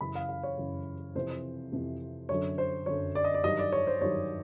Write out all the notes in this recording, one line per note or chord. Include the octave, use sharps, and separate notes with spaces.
F#2 C#3 E3 B5
F5
F5
C#5
F#2 C#3 E3
F2 C3 E3 C5
F2 C3 E3
F#2 D3 F#3 C#5
C5
F#2 D3 F#3 C#5
D5
D#5
D5
G2 D#3 F#3 D#5
D5
C#5
C5
G2 D#3 F#3 C#5